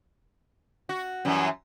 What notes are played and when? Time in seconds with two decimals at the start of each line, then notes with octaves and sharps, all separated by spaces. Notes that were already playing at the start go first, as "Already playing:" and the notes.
0.89 F#4
1.25 F#2 E3 G3